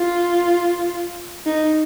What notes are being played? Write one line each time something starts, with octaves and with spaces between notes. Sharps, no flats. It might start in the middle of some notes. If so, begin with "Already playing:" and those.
Already playing: F4
D#4